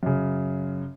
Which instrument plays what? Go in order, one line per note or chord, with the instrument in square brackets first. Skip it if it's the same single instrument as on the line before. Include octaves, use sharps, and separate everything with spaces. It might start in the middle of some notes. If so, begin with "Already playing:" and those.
[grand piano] F#2 C#3